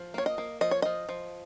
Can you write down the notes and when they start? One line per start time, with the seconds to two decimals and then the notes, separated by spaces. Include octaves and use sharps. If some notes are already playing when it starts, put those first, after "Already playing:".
Already playing: F3
0.14 A#3 C#5
0.26 D#5
0.38 A#3
0.61 F3 D#5
0.71 C#5
0.82 F3 D#5
1.09 F3